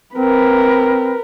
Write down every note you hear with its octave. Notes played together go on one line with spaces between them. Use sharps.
C4 A#4 B4